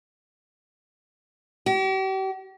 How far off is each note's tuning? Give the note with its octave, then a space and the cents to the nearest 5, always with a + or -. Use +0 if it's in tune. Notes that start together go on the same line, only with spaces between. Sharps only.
G4 -40